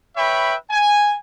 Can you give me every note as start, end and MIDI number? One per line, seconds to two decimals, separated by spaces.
0.17 0.55 71
0.17 0.55 73
0.17 0.55 76
0.17 0.55 79
0.17 0.55 83
0.70 1.15 80